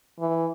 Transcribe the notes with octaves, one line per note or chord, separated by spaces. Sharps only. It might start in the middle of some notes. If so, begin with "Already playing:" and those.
E3